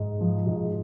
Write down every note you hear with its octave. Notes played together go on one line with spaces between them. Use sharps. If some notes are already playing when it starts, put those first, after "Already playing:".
Already playing: G#2
F3
G#2